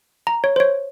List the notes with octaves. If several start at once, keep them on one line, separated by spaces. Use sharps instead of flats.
A#5
C#5
C5
C#5